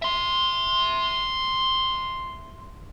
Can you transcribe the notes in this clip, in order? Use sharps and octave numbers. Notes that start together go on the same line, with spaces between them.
E5 C6